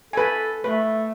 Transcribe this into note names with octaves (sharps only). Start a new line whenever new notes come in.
A4 B4 G#5
A3 B4